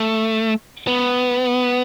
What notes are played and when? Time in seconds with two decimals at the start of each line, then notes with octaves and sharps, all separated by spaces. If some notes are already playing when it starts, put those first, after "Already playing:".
Already playing: A3
0.87 B3